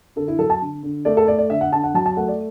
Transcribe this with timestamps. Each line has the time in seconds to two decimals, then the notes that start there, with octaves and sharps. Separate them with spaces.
0.16 D3 A4
0.28 E4
0.39 F#3 A4
0.50 A5
0.62 D3
0.83 D3
1.05 A3 D5
1.17 A4
1.28 A3 D5
1.39 D5
1.50 D3 E5
1.61 F#5
1.73 D3 A5
1.84 F#5
1.94 F#3 A5
2.06 A5
2.17 A3 F#5
2.28 D5